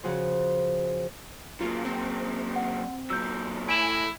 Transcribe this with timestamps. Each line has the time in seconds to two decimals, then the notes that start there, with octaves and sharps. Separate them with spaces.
0.03 C#3 F3 F#4 G#4 C5
1.61 F#3 A#3 F4
1.85 C4
2.56 F#5
3.10 A#2 F#3 E6 G6
3.69 A2 E4 G#5 D7 E7 F#7